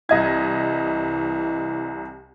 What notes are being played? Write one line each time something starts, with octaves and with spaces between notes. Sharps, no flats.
C2 E3 D#5 G#6